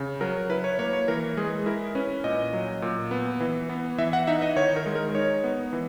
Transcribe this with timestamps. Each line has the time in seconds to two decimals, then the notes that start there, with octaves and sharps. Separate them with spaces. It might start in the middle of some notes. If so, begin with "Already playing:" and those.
Already playing: C#3
0.21 F#3 A#4
0.50 E4 B4
0.64 C#5
0.79 A#3 C#5
0.93 C#5
1.08 E3 A#4
1.37 G#3 G#4
1.66 E4 A#4
1.95 C#4 B4
2.24 A#2 D#5
2.53 F#3
2.82 A#2
3.11 B3
3.40 E3
3.69 B3
3.98 E3 E5
4.13 F#5
4.27 D#4 E5
4.42 D#5
4.56 D#3 C#5
4.76 A#4
4.86 G#3
4.95 A#4
5.15 D#4 C#5
5.44 B3
5.73 E3